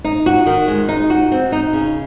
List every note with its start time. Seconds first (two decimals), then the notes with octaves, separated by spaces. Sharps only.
0.04 D#4
0.26 F#4
0.46 D#3
0.68 G#3
0.89 D#4
1.10 F#4
1.32 C4
1.52 D#4
1.73 C#3